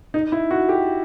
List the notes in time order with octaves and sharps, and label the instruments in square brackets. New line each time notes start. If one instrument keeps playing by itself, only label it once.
[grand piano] D#4
E4
F#4
G4